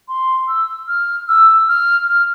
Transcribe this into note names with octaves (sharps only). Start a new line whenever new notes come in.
C6
E6
F6
E6
F6
F6